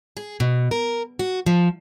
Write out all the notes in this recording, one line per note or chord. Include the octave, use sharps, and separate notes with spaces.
G#4
B2
A#4
F#4
F3